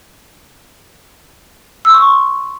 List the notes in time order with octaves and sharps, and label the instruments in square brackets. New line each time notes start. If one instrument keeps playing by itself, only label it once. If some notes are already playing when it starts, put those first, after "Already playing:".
[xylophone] E6
C6
C#6